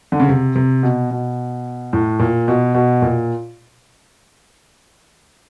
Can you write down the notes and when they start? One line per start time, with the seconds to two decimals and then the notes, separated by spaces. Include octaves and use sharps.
0.12 D3
0.20 C#3
0.29 C3
0.56 C3
0.83 B2
1.11 B2
1.93 A2
2.19 A#2
2.48 B2
2.74 B2
3.02 A#2